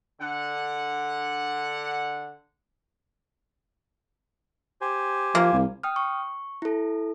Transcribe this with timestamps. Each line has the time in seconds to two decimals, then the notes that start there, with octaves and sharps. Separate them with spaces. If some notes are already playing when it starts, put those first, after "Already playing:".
0.20 D3 F#5
4.81 G4 C5 G#5
5.35 F3 A#3
5.53 C2
5.83 G5 D#6 F6
5.96 C#6
6.62 E4 A4